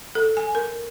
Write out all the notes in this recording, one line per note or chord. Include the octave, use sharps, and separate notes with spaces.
A4
G#5
A#4